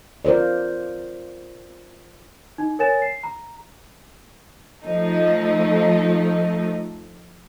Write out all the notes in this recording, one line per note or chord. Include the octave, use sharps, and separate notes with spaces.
F4 A#4 C5 D5
D#4
A#4 C#5 G#5 A6 E7
C7
A#5
F3 A3 D#4